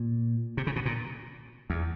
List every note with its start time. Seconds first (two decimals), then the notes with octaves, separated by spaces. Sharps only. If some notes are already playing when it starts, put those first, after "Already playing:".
Already playing: A#2
0.57 C3
0.67 C#3
0.76 B2
0.86 A#2
1.70 E2